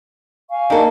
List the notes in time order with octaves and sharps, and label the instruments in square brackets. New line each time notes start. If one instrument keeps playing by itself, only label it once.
[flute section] F5 G#5 C#6
[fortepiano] A#3 D#4 [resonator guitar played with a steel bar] D4 A4